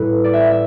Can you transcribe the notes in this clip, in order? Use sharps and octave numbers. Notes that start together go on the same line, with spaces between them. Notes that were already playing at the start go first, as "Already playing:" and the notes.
Already playing: A2 G3 A4 B4
D5
E5
E5